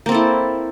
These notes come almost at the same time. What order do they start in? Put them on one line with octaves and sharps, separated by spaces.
A#3 C4 A4 E4